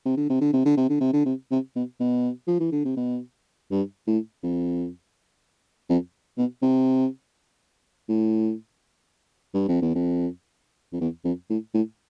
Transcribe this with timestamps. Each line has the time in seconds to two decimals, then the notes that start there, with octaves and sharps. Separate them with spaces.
0.05 C3
0.17 D3
0.30 C3
0.41 D3
0.53 C3
0.66 D3
0.77 C3
0.90 D3
1.00 C3
1.13 D3
1.26 C3
1.51 C3
1.76 B2
2.00 B2
2.48 F3
2.60 E3
2.72 D3
2.85 C3
2.97 B2
3.71 G2
4.07 A2
4.43 F2
5.90 F2
6.37 B2
6.62 C3
8.09 A2
9.54 G2
9.68 F2
9.82 E2
9.95 F2
10.93 F2
11.01 E2
11.24 F2
11.50 A2
11.74 A2